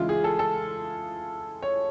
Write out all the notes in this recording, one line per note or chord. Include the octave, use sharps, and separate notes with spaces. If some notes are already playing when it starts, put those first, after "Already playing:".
Already playing: C#3 E3 G#3 E4 F4
G#4
A4
A4
C#5